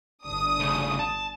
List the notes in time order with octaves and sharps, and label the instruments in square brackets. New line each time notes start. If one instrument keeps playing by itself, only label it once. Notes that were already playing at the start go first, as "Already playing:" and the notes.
[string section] G1 D4 D#6
[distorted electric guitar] C#3 A3
A5